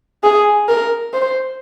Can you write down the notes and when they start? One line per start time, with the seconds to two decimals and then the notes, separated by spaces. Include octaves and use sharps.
0.24 G#4
0.69 A#4
1.14 C5